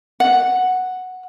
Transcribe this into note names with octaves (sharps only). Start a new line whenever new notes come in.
F#5